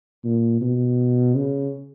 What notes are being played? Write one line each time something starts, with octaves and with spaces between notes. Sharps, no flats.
A#2
B2
C#3